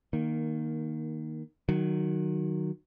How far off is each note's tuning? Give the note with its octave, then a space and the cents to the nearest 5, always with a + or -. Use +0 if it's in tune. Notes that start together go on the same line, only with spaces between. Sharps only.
D#3 -5 A#3 +10
D#3 -20 F#3 +0